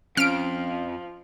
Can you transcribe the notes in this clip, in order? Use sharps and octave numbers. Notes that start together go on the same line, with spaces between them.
F2 F3 C#4 F6 D7